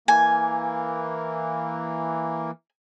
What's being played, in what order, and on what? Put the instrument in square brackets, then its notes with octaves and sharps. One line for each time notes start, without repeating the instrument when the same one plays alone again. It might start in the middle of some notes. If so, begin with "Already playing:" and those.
[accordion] E3 A#3 [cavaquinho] G#5